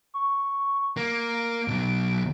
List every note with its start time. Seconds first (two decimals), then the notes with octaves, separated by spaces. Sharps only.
0.14 C#6
0.97 A#3 D7
1.68 B1 B2